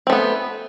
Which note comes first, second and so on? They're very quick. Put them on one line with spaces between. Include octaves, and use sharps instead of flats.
C4 A3 B3